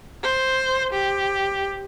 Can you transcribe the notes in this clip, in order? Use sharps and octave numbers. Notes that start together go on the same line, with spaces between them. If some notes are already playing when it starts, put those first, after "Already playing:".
C5
G4